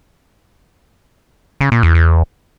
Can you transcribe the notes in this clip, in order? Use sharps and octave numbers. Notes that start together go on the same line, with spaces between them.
C#3
A#2
E2
E2